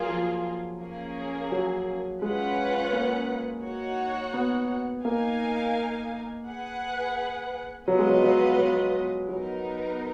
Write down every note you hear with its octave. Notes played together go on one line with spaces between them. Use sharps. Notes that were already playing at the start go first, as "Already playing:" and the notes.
Already playing: F#3 A#3 F4 G#4
F3
A#3 C#4 G#4
F#3
G#3 C#4 F4 B4 F#5
A#3
D#4 F#4 C#5 F#5
B3
A#3 D#4 A#4 F5 G#5
G#4 B4 F#5
F#3 B3 F4 B4 D#5
G#3
F#3
F#3
F#3
F#3 B3 D#4 A#4